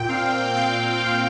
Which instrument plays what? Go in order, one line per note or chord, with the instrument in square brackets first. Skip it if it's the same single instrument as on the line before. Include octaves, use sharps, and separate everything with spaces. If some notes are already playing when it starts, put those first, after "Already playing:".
Already playing: [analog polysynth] A#2 G5
C4 F5
A#2 G5
A#2